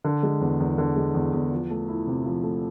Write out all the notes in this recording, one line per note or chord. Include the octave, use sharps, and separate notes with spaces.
D3
G#3
E2
E2
D3
G#3
E2
E2
F3
A3
E4
C3
F3
A3